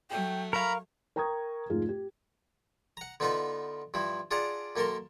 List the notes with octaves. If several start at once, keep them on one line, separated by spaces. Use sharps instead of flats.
F#3 A3 G5
A#4 F5 A#5 B5 C#6
A#4 G5 A#5 C#6 D#6 G#6
F1 G#2 F4 G#4
G4
F#5 A#5
D3 B3 D#4 F4 B4 E5
G2 F3 E4
D4 F4 G#4 D5 F#5 A#5
F#2 A#3 A4 A#4 A5 C6